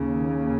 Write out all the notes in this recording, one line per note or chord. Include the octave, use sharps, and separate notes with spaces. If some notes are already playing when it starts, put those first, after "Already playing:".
Already playing: D#2 C#3